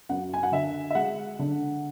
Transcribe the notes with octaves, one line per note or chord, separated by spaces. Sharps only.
F#2 F#5
G#5
F#5
D3 E5
E5
G#3 F#5
D3